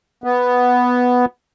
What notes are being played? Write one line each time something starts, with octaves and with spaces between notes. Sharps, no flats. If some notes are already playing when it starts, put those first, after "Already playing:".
B3